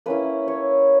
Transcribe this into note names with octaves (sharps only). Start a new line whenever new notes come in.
A#3 C#4 E4 B4
C#5